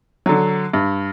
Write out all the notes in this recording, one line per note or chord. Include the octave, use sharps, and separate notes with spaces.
D3 F#3
G2